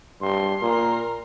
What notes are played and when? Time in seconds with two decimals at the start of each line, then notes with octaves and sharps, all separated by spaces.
0.21 G2 C6
0.61 A#2 A#4